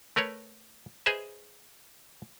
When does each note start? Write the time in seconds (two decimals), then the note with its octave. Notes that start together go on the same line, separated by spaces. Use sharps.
0.16 A3 A#4 B4 C#5
1.06 G#4 B4 C5 D#5 E5